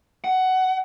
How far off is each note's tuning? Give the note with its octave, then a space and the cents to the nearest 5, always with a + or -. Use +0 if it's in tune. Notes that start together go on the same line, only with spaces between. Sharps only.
F#5 +15